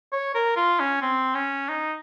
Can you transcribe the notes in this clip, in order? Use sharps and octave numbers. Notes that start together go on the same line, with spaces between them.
C#5
A#4
F4
C#4
C4
C#4
D#4